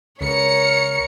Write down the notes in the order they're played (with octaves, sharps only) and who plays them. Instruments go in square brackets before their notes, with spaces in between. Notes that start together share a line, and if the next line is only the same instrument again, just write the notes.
[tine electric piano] C#2 C#3 [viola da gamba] A#4 C#5 [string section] C#7